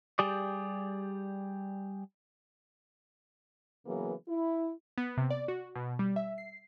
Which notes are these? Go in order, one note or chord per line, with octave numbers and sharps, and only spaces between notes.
G3 G4 G#4 D5
C#3 E3 F#3 A#3 B3 G#4
E4
B3
C3
D5
F#4
B2
G3
E5
C7